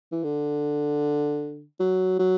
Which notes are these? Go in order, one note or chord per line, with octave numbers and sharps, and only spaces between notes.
E3
D3
F#3
F#3